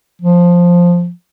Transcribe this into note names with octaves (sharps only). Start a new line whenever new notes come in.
F3